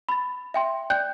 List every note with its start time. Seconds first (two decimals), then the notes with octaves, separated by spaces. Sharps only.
0.09 B5 A6
0.54 E5 G5 C6
0.90 D5 G5 F#6 G6